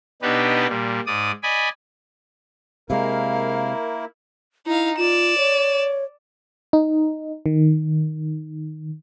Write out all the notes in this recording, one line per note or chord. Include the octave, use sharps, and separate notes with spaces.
B2 B3 D4 D#4 G4 B4
A#2 G3
G#2 D5 D#6
D5 D#5 G#5 B5
C3 G#3 A#3 E4 A#4 F5
D#4 E4 F5
F4 D5 E7
C#5
D#4
D#3